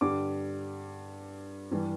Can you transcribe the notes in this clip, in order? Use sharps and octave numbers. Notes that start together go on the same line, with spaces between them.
G2 D3 G3 D6
G2 E3 G3